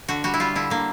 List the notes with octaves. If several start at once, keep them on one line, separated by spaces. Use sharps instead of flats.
D3 F#4
G3 F#4
E4
G3 F4
D3 E4
D3 A#3